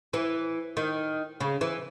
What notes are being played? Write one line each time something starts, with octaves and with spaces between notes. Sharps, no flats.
E3
D#3
C#3
E3